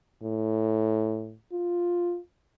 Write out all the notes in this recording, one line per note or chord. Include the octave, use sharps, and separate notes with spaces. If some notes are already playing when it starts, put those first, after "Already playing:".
A2
F4